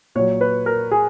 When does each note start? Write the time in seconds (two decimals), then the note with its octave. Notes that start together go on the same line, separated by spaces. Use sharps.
0.15 A#2 F#3 C#5
0.41 B4
0.66 A#4
0.92 G#4